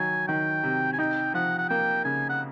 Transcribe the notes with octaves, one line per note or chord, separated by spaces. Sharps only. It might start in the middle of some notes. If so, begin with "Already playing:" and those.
Already playing: D#3 F#3 G#5
D#3 G5
C3
G#5
D#4 G5
F3 F#5
F#5
A#3 G5
C#3 G#5
F#5